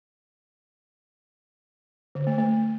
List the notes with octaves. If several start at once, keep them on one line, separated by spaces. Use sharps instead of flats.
D3
A3
A3